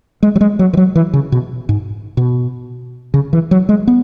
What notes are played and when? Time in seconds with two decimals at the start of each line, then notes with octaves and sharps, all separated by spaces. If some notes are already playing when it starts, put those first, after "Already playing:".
0.23 G#3
0.36 F#3
0.41 G#3
0.59 F#3
0.73 E3
0.77 F#3
0.95 E3
1.13 C#3
1.32 B2
1.69 G#2
2.17 B2
3.14 C#3
3.33 E3
3.51 F#3
3.69 G#3
3.87 B3